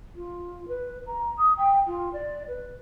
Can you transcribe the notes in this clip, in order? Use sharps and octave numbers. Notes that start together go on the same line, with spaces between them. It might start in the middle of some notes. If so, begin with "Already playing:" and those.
F4
B4
A#5
D#6
G5
F4
D5
B4